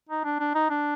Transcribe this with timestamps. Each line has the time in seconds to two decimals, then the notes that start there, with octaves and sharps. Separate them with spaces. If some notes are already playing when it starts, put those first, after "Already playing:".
0.09 D#4
0.24 D4
0.40 D4
0.55 D#4
0.70 D4